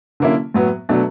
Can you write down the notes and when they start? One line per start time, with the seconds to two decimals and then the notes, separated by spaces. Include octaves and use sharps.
0.20 D3 F#3 A#3 C#4 E4
0.54 A2 F#3 B3
0.89 B2 F#3 A3 D4